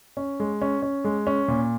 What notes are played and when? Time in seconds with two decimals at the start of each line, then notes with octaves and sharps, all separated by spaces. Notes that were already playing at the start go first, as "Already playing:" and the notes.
0.17 C#4
0.40 G#3
0.62 C#4
0.82 C#4
1.05 G#3
1.27 C#4
1.48 A#2